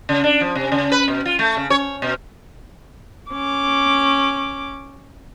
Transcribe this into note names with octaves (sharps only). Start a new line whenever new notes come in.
C#3
D4
F3
C3
C#3
B4
B2
F4
A3
C#3
C#5
B2
C#4 D6